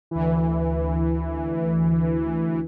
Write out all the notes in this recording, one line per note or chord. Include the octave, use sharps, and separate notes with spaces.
D2 E3